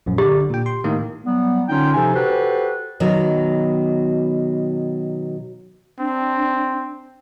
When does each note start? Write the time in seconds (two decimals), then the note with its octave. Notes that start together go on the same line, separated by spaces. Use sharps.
0.06 A#1 F#2
0.18 D3 G4 D5
0.50 A#2 G5
0.66 C6
0.84 A2 D#3 A#3
1.25 F#3 G3 B3
1.69 D3 C#4 D#4 F4 G5
1.94 C3 F3 D#4 A4 G#5
2.14 F#4 G4 A4 B4 C5
3.00 B2 D#3 F#3
5.99 C4 D4